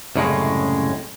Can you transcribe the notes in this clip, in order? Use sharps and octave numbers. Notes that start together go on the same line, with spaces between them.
C2 F#2 A2 C#3 G#3